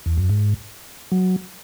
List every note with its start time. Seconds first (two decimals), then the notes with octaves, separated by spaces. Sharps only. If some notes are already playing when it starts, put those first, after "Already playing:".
0.06 E2
0.17 F#2
0.29 G#2
1.12 F#3